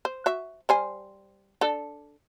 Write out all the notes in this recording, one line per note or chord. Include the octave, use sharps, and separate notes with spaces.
C5
F#4 E5
G3 C5 G#5
D4 A4